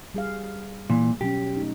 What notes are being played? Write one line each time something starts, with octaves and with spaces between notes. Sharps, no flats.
G3 G#4 F5
A#2 E3
B2 F#3 C#4 G4
A3 D#4